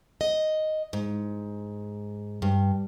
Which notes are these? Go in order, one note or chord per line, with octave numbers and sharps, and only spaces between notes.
D#5
G#2
G2